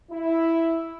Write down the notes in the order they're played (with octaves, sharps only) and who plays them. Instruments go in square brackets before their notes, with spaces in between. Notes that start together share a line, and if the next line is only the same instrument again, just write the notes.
[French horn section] E4